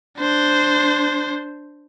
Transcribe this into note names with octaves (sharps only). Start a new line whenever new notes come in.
D4 C5